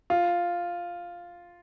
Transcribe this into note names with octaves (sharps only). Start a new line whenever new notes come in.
F4